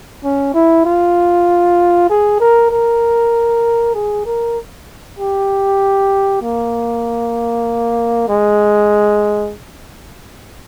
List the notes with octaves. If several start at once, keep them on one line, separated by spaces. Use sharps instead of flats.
C#4
E4
F4
G#4
A#4
A#4
G#4
A#4
G4
A#3
G#3